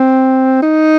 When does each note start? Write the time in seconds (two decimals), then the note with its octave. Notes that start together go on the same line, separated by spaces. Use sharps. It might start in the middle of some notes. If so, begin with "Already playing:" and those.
Already playing: C4
0.62 D#4